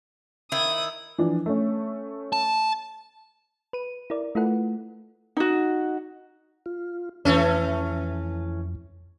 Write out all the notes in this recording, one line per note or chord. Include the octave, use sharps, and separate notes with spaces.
D#3 E4 D#6
E3 F3 D4
A3 C#4
A5
B4 D#7
E4 A#4 D5
A3 E4 F4 A4 B4 F#5
D#4 F#4
F4
F2 E3 A3 C#4